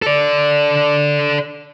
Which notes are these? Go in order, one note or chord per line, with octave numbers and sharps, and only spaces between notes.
A4 D5